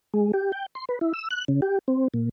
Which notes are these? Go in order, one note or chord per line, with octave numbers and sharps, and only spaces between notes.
G#3
G4
G5
C6
B4
E4
E6
F#6
C#3
G4
C4
A#2